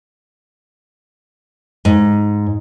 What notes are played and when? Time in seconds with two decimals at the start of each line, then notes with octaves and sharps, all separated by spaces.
1.85 G#2